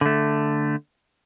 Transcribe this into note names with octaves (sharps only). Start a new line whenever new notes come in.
D3 A3